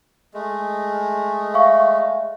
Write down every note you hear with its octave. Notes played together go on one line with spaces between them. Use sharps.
G#3 A3
E5 F5 C#6